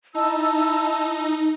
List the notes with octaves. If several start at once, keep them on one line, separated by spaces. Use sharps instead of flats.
D#4 E4 A5 E6